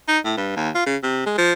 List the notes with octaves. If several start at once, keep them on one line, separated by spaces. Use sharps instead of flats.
D#4
A2
G2
D#2
F4
C#3
C3
G#3
F3